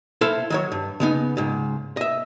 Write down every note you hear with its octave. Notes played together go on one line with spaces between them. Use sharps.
E4 A4 C5 E5 F5
D#3 F#3 C#5
G2
C#3 B3 D#4
C#2 G#2
D#5 E5